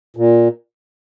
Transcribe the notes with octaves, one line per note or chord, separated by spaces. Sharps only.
A#2